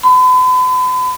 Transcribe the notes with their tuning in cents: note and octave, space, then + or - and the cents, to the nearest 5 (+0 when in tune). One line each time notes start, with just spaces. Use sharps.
B5 +40